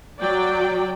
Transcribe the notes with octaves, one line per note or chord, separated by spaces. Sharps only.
F#3 D5 G5